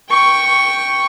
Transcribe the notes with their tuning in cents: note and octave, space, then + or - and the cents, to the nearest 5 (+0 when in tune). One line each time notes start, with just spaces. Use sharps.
G5 +0 C#6 +0